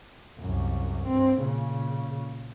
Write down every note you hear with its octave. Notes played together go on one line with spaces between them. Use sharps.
C2 F#2
G2 C4
A#2 C#3